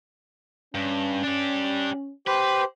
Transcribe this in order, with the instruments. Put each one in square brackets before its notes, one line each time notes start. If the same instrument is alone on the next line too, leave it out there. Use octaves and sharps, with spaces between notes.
[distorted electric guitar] G2 [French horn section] C#4
[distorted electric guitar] D4 G4
[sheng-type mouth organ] G4 C5 [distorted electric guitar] B4